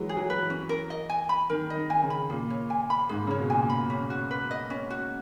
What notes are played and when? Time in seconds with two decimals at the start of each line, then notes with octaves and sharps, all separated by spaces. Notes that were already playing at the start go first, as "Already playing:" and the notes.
Already playing: E3 F#3 G#3
0.09 G#4
0.17 F#3
0.30 B4
0.42 E3
0.50 C#4
0.69 A#4
0.90 D#5
1.10 G#5
1.29 B5
1.50 D#3 A#4
1.70 D#5
1.76 D#3
1.90 G#5
2.03 C#3
2.10 B5
2.30 A#2 G#4
2.50 C#5
2.70 G#5
2.90 B5
3.09 G#2 G#4
3.27 C#3 C#5
3.38 B2
3.50 A#2 G#5
3.70 B5
3.90 C#4
4.10 F#4
4.31 B4
4.51 D#5
4.70 C#4
4.90 F#4